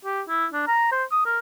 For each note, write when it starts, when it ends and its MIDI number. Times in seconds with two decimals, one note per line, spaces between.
0.05 0.21 67
0.28 0.46 64
0.53 0.64 62
0.67 0.87 82
0.92 1.04 72
1.11 1.24 87
1.26 1.39 70